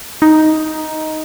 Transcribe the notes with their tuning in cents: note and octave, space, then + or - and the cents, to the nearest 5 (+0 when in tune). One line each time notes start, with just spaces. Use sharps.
D#4 +5